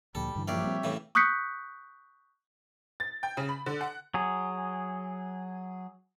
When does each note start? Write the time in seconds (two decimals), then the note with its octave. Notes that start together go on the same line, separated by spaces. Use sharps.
0.15 D2 A#2 F3 G3 A4
0.35 G2 D3 E3
0.48 A#1 G4 C#5 D5 E5 F5
0.64 G3 C4
0.84 A2 C#3 E3
1.15 C#6 D#6 F#6 G6 B6 C#7
3.00 A6
3.23 G5
3.37 C#3
3.49 B5
3.66 D3
3.81 F#5
4.14 F#3 G#4